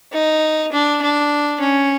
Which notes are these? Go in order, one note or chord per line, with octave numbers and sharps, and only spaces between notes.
D#4
D4
D4
C#4